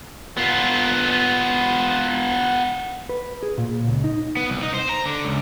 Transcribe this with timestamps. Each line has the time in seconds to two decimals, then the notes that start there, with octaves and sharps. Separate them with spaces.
0.37 B3 F4
3.09 B4
3.43 G#4
3.58 A#2
3.88 C#2
4.04 D#4
4.37 B3
4.50 C2
4.63 D#4
4.74 C5
4.89 A#5
5.06 D3
5.25 C#2